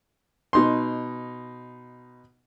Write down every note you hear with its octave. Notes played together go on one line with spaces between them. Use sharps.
B2 D#4 C6